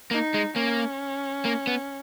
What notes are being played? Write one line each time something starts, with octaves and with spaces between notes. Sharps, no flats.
A#3 D#4
G#3
A#3 C#4
A#3
B3